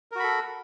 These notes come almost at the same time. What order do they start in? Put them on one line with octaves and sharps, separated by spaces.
A#4 F#4 B5 A4